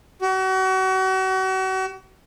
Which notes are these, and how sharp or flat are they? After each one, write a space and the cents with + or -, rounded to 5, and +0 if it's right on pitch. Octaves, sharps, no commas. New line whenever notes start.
F#4 +35